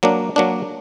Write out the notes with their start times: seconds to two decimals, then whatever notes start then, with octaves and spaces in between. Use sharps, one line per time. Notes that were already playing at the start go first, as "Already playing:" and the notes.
0.03 F#3 A#3 D4
0.36 F#3 A#3 D4